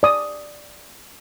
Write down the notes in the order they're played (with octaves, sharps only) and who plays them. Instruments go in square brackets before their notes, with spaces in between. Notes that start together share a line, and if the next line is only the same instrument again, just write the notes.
[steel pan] D5 D#6